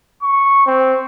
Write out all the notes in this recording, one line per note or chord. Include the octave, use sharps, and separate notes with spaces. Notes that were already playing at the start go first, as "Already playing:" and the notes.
C#6
C4